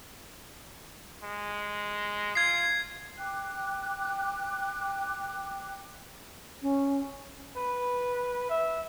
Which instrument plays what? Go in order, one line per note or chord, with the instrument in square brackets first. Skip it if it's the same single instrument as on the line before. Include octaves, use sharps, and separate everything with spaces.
[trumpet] G#3
[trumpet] F4 [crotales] G#6 C7
[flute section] G5 D6 F#6
[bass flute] C#4
[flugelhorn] B4
E5